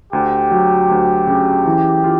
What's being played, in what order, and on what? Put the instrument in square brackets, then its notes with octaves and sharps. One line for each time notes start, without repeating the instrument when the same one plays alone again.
[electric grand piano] D2 [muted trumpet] G4
[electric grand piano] F#3
D2
C#3
E3
F4